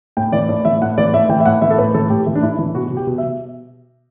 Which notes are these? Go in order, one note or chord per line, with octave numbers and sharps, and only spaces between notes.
A2 G5
E3 D5
A2 D5
E3 E5
A2 F#5
E3 D5
A2 E5
E3 G5
E5
A2 F#5
E3 E5
A4
A2 B4
E3 A4
A2 G4
E3
D4
A2 E4
E3
B2 F#4
B2
G4
B2
E5
B2